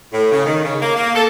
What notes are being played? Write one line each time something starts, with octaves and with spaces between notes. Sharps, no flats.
A2
C#3
D#3
C#3
A#3
A#3
A4